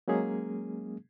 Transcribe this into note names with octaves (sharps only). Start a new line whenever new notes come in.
F#3 G#3 A#3 C#4 G#4